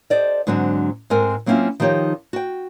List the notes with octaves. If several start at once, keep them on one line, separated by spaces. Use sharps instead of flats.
G4 A4 C5 D5 D#5
G#2 D3 F#3 C4 D4
G#2 G#3 C4 A4 A#4 G#5
F#3 A#3 C4 C#4 E4 F4
D#3 F3 D#4 G4 C#5
F#4 G5